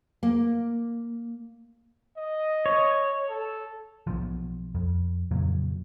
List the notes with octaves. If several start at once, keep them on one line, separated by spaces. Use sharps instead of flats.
A#3
D#5
C#5
A4
B1 B2 F3
F2
F2 A#2 C#3 F#3